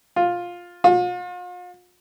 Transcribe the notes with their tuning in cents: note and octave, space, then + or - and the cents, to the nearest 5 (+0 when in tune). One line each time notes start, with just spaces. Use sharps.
F4 +10
F4 +40